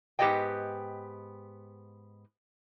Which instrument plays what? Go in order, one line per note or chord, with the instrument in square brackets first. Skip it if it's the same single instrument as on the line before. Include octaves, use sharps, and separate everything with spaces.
[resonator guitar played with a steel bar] G#2 B3 G4 D5 D#5 G5